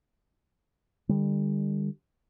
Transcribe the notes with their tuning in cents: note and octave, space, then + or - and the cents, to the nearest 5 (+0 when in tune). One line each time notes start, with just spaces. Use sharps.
D3 +40 G3 +30